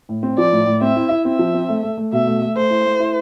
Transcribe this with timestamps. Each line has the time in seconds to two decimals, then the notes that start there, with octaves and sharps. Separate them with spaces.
0.09 A2
0.23 C4
0.38 F3 D5
0.52 A2
0.66 A2
0.81 C4 E5
0.96 E4
1.11 E4
1.25 C4 E5
1.39 F3
1.54 C4
1.69 A3
1.83 A3
1.97 A3
2.13 B2 E5
2.27 A3
2.42 A3
2.56 A3 C5
2.70 E4
2.85 A3
3.00 E4